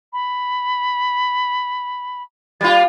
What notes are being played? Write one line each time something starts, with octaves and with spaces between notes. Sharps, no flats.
B5
G3 A#3 F4 A6